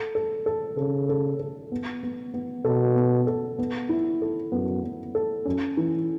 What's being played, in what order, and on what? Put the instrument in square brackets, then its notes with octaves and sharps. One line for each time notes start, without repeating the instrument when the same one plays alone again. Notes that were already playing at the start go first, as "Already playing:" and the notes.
Already playing: [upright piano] A4
A4
A4
[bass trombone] C#3 [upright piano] A4
[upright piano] A4
A4
B3
B3
B3
[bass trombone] B2 [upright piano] A4
[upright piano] B3
A4
B3
E4
A4
[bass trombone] F#2 [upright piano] B3
[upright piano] B3
A4
[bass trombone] F#2 [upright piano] C#4
[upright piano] E3